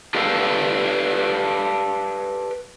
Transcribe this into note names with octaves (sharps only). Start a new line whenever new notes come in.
G4 A4 B4 D5 F5 G5